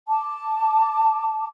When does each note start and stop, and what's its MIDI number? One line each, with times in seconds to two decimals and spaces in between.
0.07 1.45 81
0.07 1.45 86